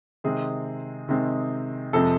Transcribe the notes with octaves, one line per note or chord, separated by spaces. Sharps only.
C3 D#3 G#3 C4 G#4
C3 D#3 G#3 C4
F2 C3 F3 G#3 C4 A4